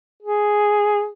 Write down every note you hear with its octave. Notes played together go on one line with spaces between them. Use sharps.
G#4